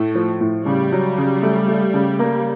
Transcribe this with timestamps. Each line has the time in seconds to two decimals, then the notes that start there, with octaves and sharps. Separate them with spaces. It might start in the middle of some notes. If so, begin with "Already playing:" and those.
Already playing: A2 A3
0.15 F3
0.41 A2
0.66 C#3 G3
0.92 F#3
1.18 C#3
1.42 A3
1.68 A3
1.94 C#3
2.19 A#3